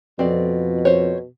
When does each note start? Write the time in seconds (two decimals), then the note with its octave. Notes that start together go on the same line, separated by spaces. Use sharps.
0.19 F2 B2 C4 D5
0.85 C5 C#5